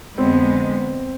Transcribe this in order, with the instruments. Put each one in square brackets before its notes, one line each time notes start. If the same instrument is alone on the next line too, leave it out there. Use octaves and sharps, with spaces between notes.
[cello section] F2 D3 G#3 B3 [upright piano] C4